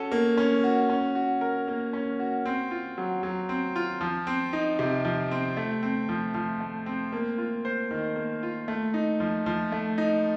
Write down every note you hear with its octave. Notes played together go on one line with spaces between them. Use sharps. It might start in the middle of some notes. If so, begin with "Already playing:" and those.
Already playing: C#4 F#4 A4
A#3
C#4
F#4
C#4
F#4
A#4
A#3
C#4
F#4
C4
F4
F#3
F#3
C4
F4
F3
C4
D#4
C3
F3
C4
A3
C4
F3
F3
A3
C4
A#3
F4
C5
D#3
A#3
F4
A3
D#4
F3
F3
A3
D#4